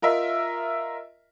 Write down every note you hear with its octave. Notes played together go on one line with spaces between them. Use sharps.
F4 A#4 D#5 E5